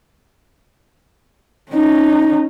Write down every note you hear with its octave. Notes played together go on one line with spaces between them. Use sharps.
C#4 D#4